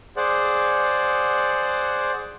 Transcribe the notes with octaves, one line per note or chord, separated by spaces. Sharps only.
G#4 C5 D5 F#5